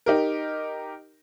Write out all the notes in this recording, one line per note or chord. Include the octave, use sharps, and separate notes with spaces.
D#4 G4 A#4